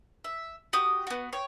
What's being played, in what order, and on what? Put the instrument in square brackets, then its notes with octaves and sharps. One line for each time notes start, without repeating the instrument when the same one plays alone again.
[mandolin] E5
F#4 G4 D#6
B3 F#4
C#5 G5